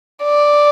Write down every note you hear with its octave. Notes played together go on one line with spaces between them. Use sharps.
D5